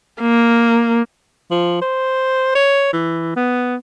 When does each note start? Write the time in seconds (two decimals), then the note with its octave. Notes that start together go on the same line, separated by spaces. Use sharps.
0.21 A#3
1.51 F3
1.82 C5
2.55 C#5
2.93 E3
3.36 B3